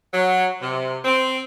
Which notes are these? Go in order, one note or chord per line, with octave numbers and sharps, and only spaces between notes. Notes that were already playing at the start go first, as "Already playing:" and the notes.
F#3
C3
C4